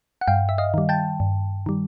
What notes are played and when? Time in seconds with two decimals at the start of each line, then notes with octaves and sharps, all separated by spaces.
0.21 F#5
0.28 G2 F5 G5
0.49 E5
0.58 D#5 F5
0.74 D#3 G3
0.89 G5 A5
1.20 G2
1.66 D#3 G3